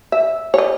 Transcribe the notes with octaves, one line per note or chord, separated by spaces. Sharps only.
E5
C#5
D#5